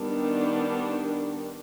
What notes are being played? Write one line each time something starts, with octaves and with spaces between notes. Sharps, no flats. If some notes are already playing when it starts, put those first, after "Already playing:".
Already playing: D#3 G3 B3 D4